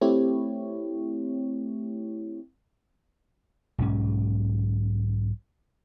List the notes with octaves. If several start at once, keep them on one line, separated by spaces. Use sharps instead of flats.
A3 C4 E4 G4 C#5
B1 G#2 C#4